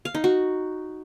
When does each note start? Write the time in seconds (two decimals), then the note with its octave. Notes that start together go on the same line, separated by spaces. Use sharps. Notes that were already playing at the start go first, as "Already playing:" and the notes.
0.05 F5
0.15 D#4
0.24 F#4